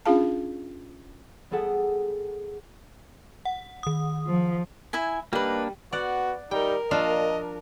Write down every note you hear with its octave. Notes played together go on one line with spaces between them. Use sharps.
C#4 D4 F4 G#4 F5 A5
G3 B3 G#4 A4 F#5 G5
F#5
D#3 D#6
F3
E4 E5 G#5
G3 A#3 D4 D#4 B4
B3 F#4 D5 F#5
G3 D#4 A#4 G5
A#2 F3 D4 D#5 F5